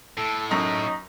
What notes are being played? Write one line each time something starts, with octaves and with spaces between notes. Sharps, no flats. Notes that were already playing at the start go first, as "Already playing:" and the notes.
A2 A4
F#2 D#4 D#5